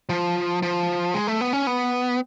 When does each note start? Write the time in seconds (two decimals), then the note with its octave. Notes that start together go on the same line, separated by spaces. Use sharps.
0.09 F3
0.62 F3
1.14 G#3
1.27 A3
1.41 B3
1.53 C#4
1.67 B3